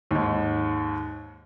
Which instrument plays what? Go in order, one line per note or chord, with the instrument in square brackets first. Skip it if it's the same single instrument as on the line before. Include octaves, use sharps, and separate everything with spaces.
[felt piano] D#2 G#2